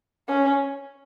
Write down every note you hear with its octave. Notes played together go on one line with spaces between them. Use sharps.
C#4